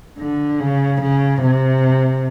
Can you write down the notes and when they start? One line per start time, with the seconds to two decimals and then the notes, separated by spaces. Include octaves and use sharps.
0.19 D3
0.60 C#3
1.02 C#3
1.42 C3